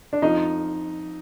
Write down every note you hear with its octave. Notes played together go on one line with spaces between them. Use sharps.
D4
F2 F3 D#4